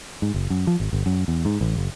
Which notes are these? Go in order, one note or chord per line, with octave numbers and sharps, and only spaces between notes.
G#2
F#1
F#2
F3
G#1
G1
F#2
E2
G#2
A1
F#1